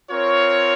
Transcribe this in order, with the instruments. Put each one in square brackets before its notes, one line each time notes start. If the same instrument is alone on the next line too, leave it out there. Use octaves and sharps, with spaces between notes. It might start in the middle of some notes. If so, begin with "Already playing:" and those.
[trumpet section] C4 F4 A#4 C#5